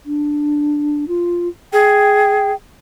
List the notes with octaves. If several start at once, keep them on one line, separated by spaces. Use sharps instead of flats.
D4
F4
G#4 G5